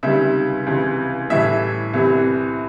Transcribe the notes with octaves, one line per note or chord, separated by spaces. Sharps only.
C#2 C3 D#3 G3 E5
C#2 C3 E3
A2 E3 G3 E5
C2 C3 E3